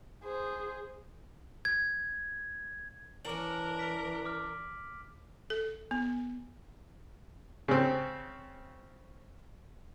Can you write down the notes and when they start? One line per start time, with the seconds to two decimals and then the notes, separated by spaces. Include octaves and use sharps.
0.24 G#4 C5
1.65 G#6
3.25 E3 C#4 D4 A#4 D6 F#7
3.79 B6 D7
4.25 D6 F6
5.50 A4
5.91 B3
7.68 C#3 C4